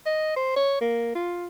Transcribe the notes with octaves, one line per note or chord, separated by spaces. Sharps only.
D#5
C5
C#5
A#3
F4